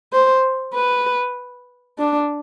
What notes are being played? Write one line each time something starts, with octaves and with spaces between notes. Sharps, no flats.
C5
B4
D4